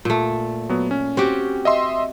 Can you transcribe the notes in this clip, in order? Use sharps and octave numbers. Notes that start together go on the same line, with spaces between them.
A#2 A3
F#3 B3
C#4
C4 F#4 G4
D#5 E5 C6